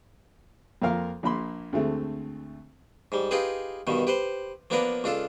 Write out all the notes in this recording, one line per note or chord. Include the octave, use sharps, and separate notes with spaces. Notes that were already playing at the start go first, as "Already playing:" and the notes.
F2 A#3 F4 A#4 F5
A#1 A#3 B5 C6
D2 G#3 A3 C4
G#2 G3
D#4 F4 G4 G#4 B4
G2 B2 D#3
G4 B4 C5
F3 A#3 B3 D4 A#4 B4
C#2 D4 F4 A4